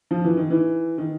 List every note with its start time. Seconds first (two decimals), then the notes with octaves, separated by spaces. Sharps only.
0.11 F3
0.24 E3
0.37 D#3
0.50 E3
0.98 D#3